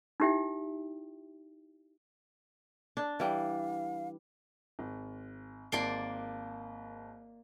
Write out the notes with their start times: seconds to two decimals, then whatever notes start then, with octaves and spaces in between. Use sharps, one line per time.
0.20 D#4 E4 G4 E5 G5
2.97 D4
3.20 E3 G3 F5
4.79 G#1
5.72 G#1 A#3 D5 A5 C6 G7